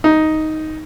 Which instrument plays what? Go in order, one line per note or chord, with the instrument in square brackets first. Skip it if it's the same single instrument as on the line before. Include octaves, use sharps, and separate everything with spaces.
[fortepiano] D#4